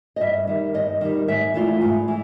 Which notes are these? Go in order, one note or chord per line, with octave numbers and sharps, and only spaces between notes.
D#5
G2 E5
D#3 G3
G2 D#5
D#3 G3
G#2 E5
E3 A3 D4 F4
G#2
E3